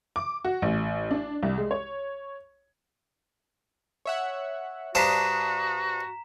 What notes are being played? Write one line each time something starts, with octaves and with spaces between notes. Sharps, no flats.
D6
F#4
A1
D4
C2
G#3
C#5
C#5 E5 F#5
G2 D4 F#4 C5 A#5 D#6 B6 E7